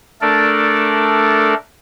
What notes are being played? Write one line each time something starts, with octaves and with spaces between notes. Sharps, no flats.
A3 D4 A4 A#4 D5